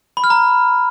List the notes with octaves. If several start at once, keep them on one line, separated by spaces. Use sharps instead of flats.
B5
F6
A#5